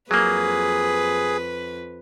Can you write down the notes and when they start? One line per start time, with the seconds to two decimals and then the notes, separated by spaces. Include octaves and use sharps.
0.11 F2 F#3 A#3 G#4 B4